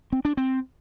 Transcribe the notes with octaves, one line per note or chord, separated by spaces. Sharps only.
C4
D4
C4